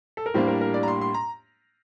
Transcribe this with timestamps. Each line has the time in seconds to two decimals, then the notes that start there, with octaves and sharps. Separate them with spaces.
0.17 A4
0.26 A#4
0.34 A2 G3 A#3 D4 C5
0.48 A#4
0.61 A#4
0.74 D5
0.83 A#5
0.88 C6
1.01 C6
1.14 A#5